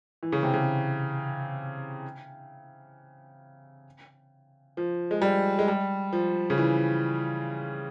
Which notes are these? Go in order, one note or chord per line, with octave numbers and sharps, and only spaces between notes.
E3
C#3
C3
C#3
F3
G#3
G3
G#3
G3
F3
C#3
E3